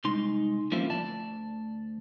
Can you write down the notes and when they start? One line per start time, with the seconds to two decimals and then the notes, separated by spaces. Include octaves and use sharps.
0.04 C2 G#3 D#4 C6
0.72 F3 A#3 C4 C#4 E4 F4
0.90 D2 D5 A5